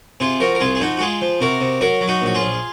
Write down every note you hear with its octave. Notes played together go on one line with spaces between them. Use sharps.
C3 F4 G#4
F3 F#4 A#4
A#4
C2 F4 G#4
G#4
F3 D#4 F#4
F#4
G#3 F4 G#4
F3
C3 F#4 A#4
C3
F#3 F#4 A#4
F#3
D#4 F#4
A#1 F#4
F4 G#4
A#1